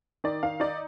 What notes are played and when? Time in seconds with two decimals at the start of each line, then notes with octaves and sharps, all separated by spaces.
0.24 D#3 D5
0.43 D#3 F5
0.60 D#4 D5